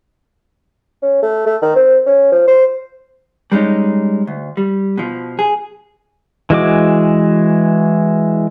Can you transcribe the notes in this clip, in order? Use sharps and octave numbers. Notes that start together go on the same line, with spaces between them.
C#4
A3
A3
D#3
C4
C#4
F3
C5
G3 G#3 C#4 D#4
D2
G3
B2 F3
G#4
E3 G#3 F#4 D6